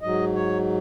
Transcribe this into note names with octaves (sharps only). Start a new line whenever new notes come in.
G#2 F#3 D#5
C#5